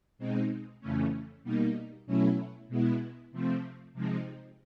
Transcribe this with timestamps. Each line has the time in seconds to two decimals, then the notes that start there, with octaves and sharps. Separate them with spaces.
0.18 B2 G#3 C4 D#4
0.80 F2 C#3 E3 A3 C#4
1.44 B2 G3 A#3 D#4
2.06 B2 F#3 A3 C#4 E4
2.69 B2 G#3 B3 E4
3.31 C3 F3 A3 C4
3.94 C3 F3 G#3 C4 D#4